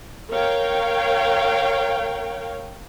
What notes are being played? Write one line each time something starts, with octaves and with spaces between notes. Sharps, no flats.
A#4 C#5 F5 G5